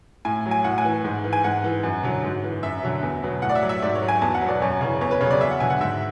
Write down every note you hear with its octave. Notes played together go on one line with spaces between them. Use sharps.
A2 G#5
F#3
G#5
A2 F#5
G#5
E3
G#2
E3
G#5
G#2 F#5
E3
F#2
D3 F#3
G#2
E3
F#2 E5
D3 F#3
E2
B2 F#3
A2 F#5
D5
E5
F#3
E5
G#2 D5
C#5
F#3
G#5
E2 A5
F#5
F#3
B2 D5
F#2 C#5
C#3 E3
E2 C#5
B4
C#3 F#3 C#5
D5
E2 E5
F#5
D3 F#3 G#5
F#5
G#2 E5